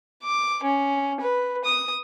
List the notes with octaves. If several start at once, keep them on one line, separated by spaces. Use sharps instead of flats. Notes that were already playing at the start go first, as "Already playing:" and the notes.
D6
C#4
B4
D#6